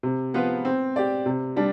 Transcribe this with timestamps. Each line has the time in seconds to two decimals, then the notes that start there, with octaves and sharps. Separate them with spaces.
0.03 C3
0.34 F3 B3 F4 B4
0.65 C4
0.96 G4 D5
1.26 C3
1.56 G3 D4